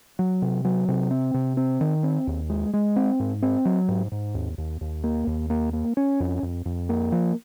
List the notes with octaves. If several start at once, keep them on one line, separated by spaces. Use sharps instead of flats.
F#3
C3
F#3
C3
C4
C3
C4
D#3
C4
D#2
G#3
G#3
C4
G#2
C4
F#3
G#2
G#2
D#2
D#2
D#2
A#3
D#2
A#3
A#3
C#4
F2
F2
F2
A#3
F3